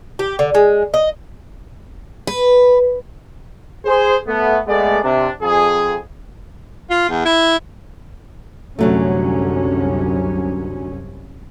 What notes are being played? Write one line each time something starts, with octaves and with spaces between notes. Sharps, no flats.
G4
D3
G#3
D#5
B4
G#4 C5
A3 B3
G#3 A3 B3 D5
C3 D4
F2 G#4
F4
E2
E4
C2 F#2 D3 F#3 A3 C#4